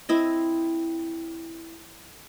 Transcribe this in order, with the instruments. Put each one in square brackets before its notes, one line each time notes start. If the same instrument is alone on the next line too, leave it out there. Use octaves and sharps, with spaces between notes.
[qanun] C4 E4 D#5